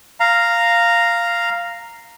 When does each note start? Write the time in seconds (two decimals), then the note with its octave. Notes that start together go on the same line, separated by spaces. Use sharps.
0.20 F5 A#5